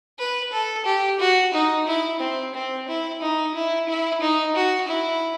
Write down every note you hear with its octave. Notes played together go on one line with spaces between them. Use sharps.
B4
A4
G4
F#4
D#4
E4
C4
C4
E4
D#4
E4
E4
D#4
F#4
E4